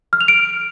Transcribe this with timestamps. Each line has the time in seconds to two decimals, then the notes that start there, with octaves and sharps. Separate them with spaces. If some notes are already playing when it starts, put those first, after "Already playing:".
0.13 F6
0.21 F7
0.28 D7